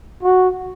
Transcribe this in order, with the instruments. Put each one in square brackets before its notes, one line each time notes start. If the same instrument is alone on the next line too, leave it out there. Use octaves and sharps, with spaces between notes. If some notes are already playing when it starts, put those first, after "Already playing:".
[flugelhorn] F#4